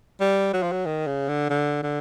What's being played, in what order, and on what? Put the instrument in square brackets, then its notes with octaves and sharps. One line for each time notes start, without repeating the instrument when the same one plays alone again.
[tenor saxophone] G3
F#3
F3
F#3
D#3
C#3
D3
D3
D3